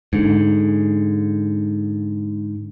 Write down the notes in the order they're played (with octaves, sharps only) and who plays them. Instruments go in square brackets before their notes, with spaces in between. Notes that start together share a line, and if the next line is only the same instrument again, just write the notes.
[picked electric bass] G#2 D3